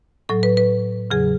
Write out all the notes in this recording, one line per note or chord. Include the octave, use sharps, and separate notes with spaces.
A2 F#3 A4
B4
B4
E2 C#3 F#3 G#4